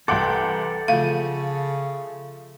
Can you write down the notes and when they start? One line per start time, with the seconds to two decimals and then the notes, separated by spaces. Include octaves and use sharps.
0.08 C2 E3 A4 F#5 G5 C6 D6
0.88 C#3 F3 A3 F5